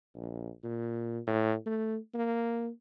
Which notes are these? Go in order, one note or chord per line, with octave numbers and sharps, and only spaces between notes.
A#1
A#2
A2
A3
A#3